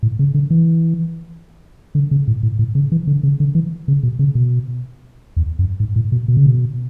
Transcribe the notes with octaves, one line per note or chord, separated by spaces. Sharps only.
A2
C#3
D3
E3
D3
C#3
A2
A2
A2
C#3
E3
D3
C#3
D3
E3
C#3
B2
C#3
B2
E2
F#2
G#2
A2
B2
B2
C#3
B2